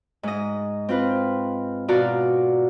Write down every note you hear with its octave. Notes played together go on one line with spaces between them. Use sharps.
G#2 D#5
C4 F4 B4
B2 F4 F#4 D5 A#5